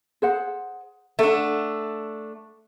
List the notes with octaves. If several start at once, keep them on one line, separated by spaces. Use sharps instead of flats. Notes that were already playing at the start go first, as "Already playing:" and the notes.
G#4 C5 F#5
A3 D4 A4 F#5